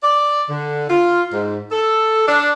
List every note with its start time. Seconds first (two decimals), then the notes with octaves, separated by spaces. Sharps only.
0.03 D5
0.49 D3
0.89 F4
1.32 G#2
1.71 A4
2.27 D4